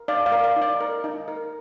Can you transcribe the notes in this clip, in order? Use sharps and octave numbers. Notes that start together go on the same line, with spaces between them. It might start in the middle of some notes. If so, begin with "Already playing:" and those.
Already playing: A#4
D#4 D5 F5
D5 F5
A#4
D5 F5
D#4
D5
A#4
D#4
A#4